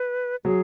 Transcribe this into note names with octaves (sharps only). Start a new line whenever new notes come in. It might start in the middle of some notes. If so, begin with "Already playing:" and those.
Already playing: B4
F#3 G#4